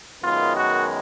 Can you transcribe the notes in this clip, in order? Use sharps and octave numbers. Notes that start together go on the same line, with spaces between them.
F#2 D#3 G#3 B3 F4
F#4